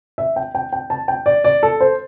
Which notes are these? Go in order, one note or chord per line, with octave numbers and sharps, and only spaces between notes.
E5
G5
G5
G5
A5
G5
D5
D5
A4
C5